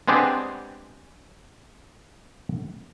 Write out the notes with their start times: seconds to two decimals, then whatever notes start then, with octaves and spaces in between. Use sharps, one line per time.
0.08 G#3 B3 C4 D4 G4 G#4